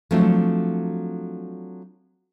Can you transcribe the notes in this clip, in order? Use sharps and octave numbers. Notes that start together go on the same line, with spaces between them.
F3 F#3 A3 C4 D4